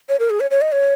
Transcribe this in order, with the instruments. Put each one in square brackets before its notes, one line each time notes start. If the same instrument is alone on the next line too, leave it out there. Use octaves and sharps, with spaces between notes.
[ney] C#5
A#4
G#4
C#5
C#5
D#5
C#5